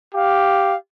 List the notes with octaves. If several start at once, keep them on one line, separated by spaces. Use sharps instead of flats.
G4 F5